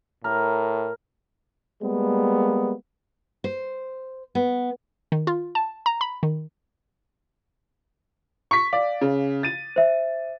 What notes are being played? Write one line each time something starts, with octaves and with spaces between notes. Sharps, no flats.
A2 A#4
G3 G#3 A#3 B3
C5
B3
D#3
F4
A5
A#5
B5
D#3
C#6 B6
D5 F5
C#3
A6 D#7
C5 E5